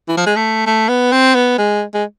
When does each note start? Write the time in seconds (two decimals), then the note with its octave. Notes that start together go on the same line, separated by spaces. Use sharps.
0.08 E3
0.17 F3
0.26 G#3
0.36 A3
0.66 A3
0.89 B3
1.12 C4
1.35 B3
1.58 G#3
1.94 G#3